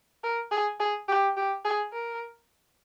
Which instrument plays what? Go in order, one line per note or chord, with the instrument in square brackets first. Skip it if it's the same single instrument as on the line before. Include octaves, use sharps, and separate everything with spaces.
[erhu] A#4
G#4
G#4
G4
G4
G#4
A#4